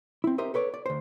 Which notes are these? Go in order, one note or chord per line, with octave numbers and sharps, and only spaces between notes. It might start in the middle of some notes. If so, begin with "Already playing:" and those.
C4 E4
G4 A#4 C5 D#5 E5
A4 B4 C#5 D5
D5
D2 C5